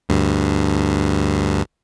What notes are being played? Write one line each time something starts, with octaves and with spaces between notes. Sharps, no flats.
D2 G2